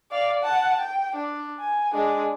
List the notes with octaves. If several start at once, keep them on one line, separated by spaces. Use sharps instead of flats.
D5 F5
F#5 A5
G5
D4
G#5
G#3 D4